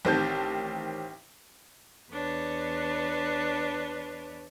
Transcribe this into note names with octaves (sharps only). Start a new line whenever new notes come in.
A1 D#3 C4 G4 A5 G6
E2 D4 B4 C#5